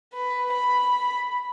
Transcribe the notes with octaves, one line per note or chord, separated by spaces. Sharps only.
B4
B5